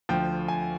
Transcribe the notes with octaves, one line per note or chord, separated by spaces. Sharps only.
D2 D3 F3 G5
G#5